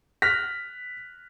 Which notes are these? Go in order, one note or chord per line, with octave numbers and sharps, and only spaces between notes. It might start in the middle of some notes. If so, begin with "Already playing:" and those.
F6 F#6 A#6 B6